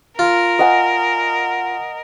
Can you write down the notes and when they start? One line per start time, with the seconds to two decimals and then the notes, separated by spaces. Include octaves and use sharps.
0.19 F4 A#4
0.59 D#5 F#5 G#5